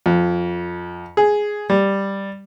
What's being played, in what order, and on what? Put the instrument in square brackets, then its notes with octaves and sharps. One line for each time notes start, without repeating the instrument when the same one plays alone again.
[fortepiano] F2
G#4
G3